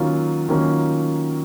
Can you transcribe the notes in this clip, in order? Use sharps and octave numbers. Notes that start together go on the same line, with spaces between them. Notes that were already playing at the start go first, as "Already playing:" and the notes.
Already playing: D#3 F#3 A#3 C#4 F4
D#3 F#3 A#3 C#4 F4